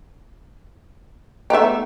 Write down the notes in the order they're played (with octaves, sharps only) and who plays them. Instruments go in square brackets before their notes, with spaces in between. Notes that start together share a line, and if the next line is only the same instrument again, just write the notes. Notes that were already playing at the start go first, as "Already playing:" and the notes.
[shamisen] A3 B3 D#4 [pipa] G4 E5